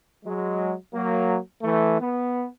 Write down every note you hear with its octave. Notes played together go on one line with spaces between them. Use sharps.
F#3 G#3
F#3 A#3
E3 A3
B3